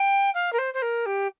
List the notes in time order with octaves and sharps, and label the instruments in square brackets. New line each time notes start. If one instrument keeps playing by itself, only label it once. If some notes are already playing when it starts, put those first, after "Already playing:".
Already playing: [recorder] G5
F5
A#4
C5
C5
A#4
G4